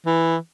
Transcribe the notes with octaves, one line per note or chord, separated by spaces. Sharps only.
E3